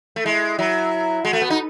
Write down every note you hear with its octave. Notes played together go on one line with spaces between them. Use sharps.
A3
G#3 E4
F#3 E4
G#3 F#4
A3
B3
D#4